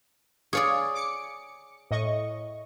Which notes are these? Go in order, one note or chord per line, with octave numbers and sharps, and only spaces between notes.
G#4 C#5 D5 F5 C#6
D6 C#7
A2 D#5 C#6